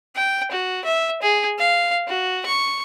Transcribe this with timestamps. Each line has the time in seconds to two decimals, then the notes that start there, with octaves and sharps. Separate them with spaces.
0.16 G5
0.51 F#4
0.85 E5
1.22 G#4
1.58 F5
2.08 F#4
2.46 C#6